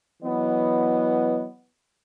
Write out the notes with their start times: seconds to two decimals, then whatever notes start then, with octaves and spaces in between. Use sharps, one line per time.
0.23 E3 F#3 B3 B4 D#5